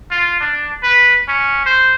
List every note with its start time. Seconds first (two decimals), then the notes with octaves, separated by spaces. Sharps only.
0.11 F4
0.40 D4
0.83 B4
1.28 C#4
1.66 C5